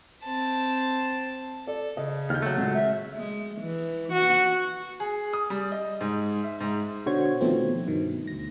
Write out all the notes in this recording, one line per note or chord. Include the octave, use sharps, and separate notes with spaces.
C4 A5
A4 D5
C#3 D#5
D#2 F6 G6
F#3 A3
C#2 A#2
D#3 E5
G#3
E3
F#4
G#4
D#6
G3
D#5
G#2
E5
G#2
B2 D3 F#4 C5 C#5 G#6
B2 D#3 F3 A3 B3 C4
G2 B2 D#3
D2 A#6